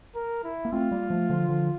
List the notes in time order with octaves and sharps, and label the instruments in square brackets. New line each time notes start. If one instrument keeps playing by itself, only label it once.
[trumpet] A#4
E4
[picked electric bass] A#3
[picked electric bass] A3 C4 [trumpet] F4
[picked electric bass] G3 A#3
F3 A3
D3 F3
D3 F3